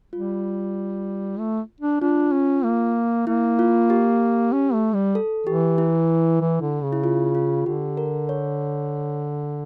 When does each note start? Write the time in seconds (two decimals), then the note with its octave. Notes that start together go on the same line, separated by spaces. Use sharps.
0.12 G3 F4
1.39 A3
1.80 D4
2.01 D4 F4
2.32 C#4
2.64 A#3
3.27 A#3 E4
3.59 F4
3.90 G4
4.52 C#4
4.73 A3
4.94 G3
5.15 A4
5.47 E3 G4
5.78 E4
6.41 E3
6.62 D3
6.83 C#3
6.93 E4
7.04 F4
7.35 F4
7.66 D3 G4
7.97 A#4
8.29 C#5